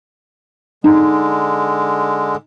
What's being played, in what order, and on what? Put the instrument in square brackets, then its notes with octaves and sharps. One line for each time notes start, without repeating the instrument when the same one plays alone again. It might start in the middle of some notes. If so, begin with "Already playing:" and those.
[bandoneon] D3 G#3 [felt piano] D#4